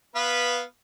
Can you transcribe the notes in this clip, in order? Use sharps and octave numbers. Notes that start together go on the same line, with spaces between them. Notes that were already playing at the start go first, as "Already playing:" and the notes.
B3 B4 F5